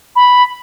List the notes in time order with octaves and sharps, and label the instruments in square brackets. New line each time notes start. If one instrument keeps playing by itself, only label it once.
[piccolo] B5